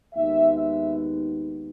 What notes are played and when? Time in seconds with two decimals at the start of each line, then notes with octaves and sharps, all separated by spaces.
0.13 D#2 D#3 G#3 B3 E5
0.55 E5